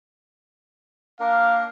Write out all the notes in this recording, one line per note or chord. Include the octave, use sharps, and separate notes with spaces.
A#3 D4 A#4 F5